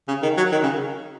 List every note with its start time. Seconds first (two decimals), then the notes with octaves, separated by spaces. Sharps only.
0.08 C#3
0.23 D#3
0.37 F#3
0.52 D#3
0.63 C#3